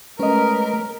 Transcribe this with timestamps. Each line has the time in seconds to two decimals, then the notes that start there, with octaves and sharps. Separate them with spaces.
0.19 G#3 A3 C#4 A#4 B4 D#5